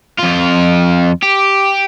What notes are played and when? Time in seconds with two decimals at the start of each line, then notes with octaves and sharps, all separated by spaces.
0.18 F2 F4
1.22 G4